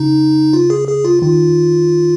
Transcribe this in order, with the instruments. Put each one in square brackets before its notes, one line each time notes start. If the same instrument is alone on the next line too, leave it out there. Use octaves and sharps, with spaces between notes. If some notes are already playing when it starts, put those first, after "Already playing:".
Already playing: [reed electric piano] C#3 [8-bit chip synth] D#4
[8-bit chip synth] F4
G#4
G#4
F4
[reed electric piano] D#3 [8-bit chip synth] F4